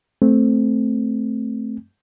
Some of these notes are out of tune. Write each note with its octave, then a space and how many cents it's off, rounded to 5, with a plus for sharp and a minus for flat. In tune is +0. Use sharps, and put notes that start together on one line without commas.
A3 -5 C4 +0